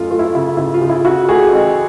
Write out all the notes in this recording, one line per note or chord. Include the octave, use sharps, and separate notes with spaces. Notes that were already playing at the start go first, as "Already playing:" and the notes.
Already playing: F#2 A3 F4
A3 F4
E4
C#3 E4
C#3 E4
F4
C#3
E4
C#3 E4 F#4
A3 F#4 G#4
A1